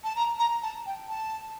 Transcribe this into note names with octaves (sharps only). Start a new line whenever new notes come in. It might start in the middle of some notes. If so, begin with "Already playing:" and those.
A5
A#5
A#5
A5
G5
A5